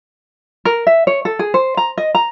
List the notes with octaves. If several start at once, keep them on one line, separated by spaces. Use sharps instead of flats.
A#4
E5
C#5
A4
G#4
C5
A#5
D#5
A#5